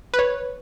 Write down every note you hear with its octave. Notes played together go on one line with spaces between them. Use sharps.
B4
C#5